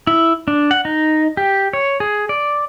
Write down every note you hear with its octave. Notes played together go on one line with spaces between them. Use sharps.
E4
D4
F#5
D#4
G4
C#5
G#4
D5